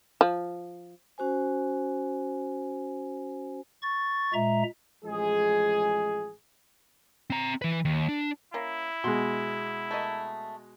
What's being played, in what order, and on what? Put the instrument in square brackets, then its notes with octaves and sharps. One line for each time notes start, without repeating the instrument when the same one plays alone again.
[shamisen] F3
[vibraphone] C#4 F#4 C5 G#5
[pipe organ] C#6 A6
A#2 G#3 E5 A#5
[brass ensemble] A1 F3 G#3 G#4
[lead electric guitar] C4 A#5
E3 B4
D#2
D4
[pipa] A#3 C#4 [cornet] E4
[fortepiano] B2 G#3 [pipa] C6
[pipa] A3 A#3 D#5